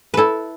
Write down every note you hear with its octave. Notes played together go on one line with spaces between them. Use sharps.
E4 A4 B4